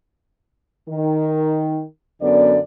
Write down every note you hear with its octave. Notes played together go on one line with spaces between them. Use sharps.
D#3
F#2 D3 B3 D5